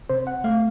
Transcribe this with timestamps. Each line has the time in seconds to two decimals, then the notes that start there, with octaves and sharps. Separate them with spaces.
0.10 C3 C5
0.27 F#5
0.44 A3 F5